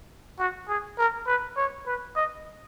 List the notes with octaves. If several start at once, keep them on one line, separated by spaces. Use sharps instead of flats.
F#4
G#4
A#4
B4
C#5
B4
D#5